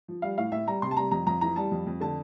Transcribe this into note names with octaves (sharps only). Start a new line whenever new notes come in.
F3
G3 F5
A2 F5
A2 E5
G3 A#5
C3 C6
A5
G3 A#5
F2 A#5
F2 A#5
E3 A#5
G3 A5
F2
F2
D3 A5